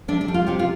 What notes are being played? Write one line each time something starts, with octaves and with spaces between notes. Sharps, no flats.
C3 D4
D4
G3
F4
C3 G4
F4